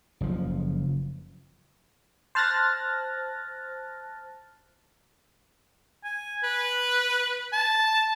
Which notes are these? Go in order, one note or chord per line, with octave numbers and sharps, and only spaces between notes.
F#1 F3
C5 A5 F6 F#6 A6 A#6
G#5
B4
A5